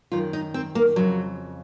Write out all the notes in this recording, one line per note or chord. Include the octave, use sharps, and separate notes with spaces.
F#2 D#3 F4
D#4
C4
A#3
F2 C#3 F#3